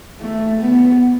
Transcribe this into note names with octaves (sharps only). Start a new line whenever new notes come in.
A3
B3